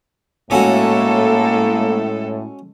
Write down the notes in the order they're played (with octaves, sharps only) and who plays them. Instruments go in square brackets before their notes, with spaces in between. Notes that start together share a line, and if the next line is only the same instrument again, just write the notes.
[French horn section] A2 [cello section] G#3 A4 [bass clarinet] A#3 [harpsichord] C#4 F#4